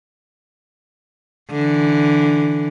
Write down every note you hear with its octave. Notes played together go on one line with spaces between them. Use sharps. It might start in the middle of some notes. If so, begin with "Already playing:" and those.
D3 E3